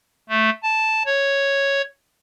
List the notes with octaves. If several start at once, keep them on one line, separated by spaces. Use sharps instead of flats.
A3
A5
C#5